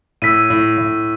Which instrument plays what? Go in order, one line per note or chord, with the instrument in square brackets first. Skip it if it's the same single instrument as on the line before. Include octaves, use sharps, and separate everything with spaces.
[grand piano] A2 [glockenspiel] E6 B6 D#7
[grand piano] A2
A2